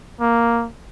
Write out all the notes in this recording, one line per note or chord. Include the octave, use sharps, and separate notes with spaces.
A#3